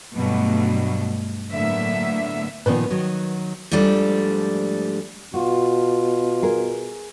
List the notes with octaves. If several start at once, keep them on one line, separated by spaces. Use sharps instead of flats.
G2 B2 F#3 G3 A3
A2 D3 F#3 A#3 B3 E5
A#2 D#3 F3 B3 B4
D#3 F#3
G#2 F3 G3 A3 D4
B2 F4 F#4
G#4 A#4